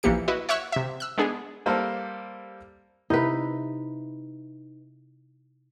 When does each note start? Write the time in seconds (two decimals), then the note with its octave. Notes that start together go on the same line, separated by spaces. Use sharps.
0.03 A#1 E3 A#3 G4 C#7
0.28 E4 F#4 B4 D#5
0.49 C#5 E5 F#5 C#6 E6 F#6
0.72 C3 E5
1.00 E6 F#6
1.18 G#3 B3 D4 G#4
1.66 G3 A#3 C4 A4 C5
3.10 C3 D#4 E4 B4